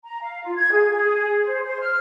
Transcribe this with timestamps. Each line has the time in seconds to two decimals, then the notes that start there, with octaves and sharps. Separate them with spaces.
0.05 A#5
0.21 F5
0.44 F4
0.56 G#6
0.72 G#4
0.91 G#4
1.42 C5
1.64 C5
1.81 F6